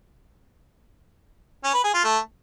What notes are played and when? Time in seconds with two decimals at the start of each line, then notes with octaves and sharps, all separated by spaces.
1.64 C#4
1.74 B4
1.84 G#4
1.94 F4
2.04 A3